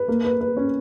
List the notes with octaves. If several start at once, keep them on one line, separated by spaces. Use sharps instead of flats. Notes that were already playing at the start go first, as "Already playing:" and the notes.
Already playing: B4
A#3
B4
B4
C#4